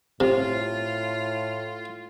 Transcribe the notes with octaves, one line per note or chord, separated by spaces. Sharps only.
A2 C3 F4